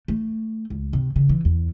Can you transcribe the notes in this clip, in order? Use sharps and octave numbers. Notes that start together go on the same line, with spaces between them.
A3
C#2
C3
C#3
E3
E2